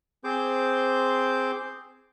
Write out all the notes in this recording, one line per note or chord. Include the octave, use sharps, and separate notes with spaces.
C4 G#4 C5 C6 D6 G6